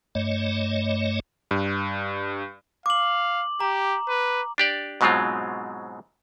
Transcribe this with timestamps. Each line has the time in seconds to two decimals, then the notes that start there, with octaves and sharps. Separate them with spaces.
0.15 G2 A3 C#5 D#5
1.51 G2
2.86 F5 D6 F#7
3.60 G4 A#5
4.08 B4
4.58 D4 G4 D5
5.01 G#2 B2 F#3 G#3 C4 F4